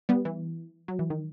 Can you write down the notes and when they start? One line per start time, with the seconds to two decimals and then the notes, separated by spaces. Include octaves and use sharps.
0.09 G3 B3
0.25 E3
0.88 F#3
0.99 E3
1.10 D#3